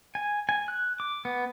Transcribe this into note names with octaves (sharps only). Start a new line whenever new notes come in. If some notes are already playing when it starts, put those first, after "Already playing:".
G#5
G#5
F#6
D6
B3